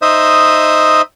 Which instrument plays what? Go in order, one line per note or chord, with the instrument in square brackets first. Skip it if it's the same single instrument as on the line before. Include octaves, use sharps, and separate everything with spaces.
[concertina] D#4 C5 D#5 E5 D#6